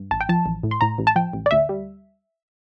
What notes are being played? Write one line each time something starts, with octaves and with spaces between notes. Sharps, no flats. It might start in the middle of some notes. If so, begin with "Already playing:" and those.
Already playing: G2
A1 A5
G5
F3 A5
A1
A2
C6
A2 A#5
A1
A5
F3 G5
A1
D5
D2 E5
G3